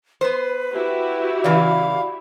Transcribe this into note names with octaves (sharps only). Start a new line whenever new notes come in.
B3 B4 C5
E4 F#4 G4
C#3 E3 D5 F5 B5